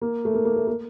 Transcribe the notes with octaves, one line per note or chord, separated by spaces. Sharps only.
A#3
A3
A#3
A#3
A3
A#3